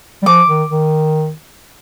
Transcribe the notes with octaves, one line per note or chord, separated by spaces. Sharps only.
G3
F3 D6
D#3
D#3